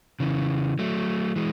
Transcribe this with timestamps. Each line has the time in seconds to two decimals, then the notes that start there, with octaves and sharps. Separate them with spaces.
0.20 C#3 E3
0.79 F#3 A3
1.36 E3 G#3